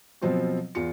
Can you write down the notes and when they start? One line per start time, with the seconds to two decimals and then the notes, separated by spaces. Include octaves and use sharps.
0.22 B2 F3 F#3 C4 F4 F#4
0.75 E2 F4 C#7